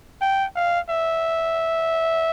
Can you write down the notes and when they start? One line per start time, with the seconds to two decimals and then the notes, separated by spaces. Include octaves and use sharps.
0.21 G5
0.56 F5
0.89 E5